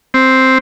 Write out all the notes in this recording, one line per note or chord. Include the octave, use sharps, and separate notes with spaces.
C4